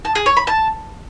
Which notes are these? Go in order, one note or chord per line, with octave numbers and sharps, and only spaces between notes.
A5
G#4
C#5
B5
A5